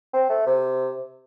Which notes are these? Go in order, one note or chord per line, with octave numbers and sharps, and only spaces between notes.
C4
A3
C3